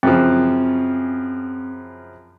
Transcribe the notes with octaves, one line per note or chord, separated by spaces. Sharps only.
F#2 C#3 F3 C4